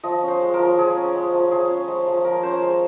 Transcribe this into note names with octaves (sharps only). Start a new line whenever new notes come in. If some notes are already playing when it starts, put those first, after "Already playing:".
F3 D#5
C#4
C5
G#3
A#4
F3
F3 G#4
C#4
G#3
F3
F3 G#4
C#4
G#3
F3
F3 A#4
C#4 C5
G#3